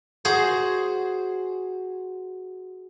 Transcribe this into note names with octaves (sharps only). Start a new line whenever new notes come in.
F#4 G#4 C5